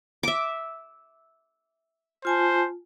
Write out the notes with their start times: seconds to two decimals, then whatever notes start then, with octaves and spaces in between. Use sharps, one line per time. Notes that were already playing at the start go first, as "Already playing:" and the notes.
0.23 E5 D6
2.25 F4 C5 G#5 A5